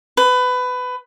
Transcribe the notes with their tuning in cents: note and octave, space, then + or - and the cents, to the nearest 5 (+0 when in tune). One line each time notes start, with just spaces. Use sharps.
B4 +20